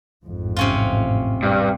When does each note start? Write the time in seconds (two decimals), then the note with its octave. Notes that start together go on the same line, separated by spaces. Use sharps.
0.24 A1 F2 G#2
0.57 C3 C#4 F4
1.43 G2